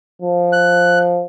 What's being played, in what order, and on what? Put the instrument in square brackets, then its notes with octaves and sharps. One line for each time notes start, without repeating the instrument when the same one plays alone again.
[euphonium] F3
[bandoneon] F#6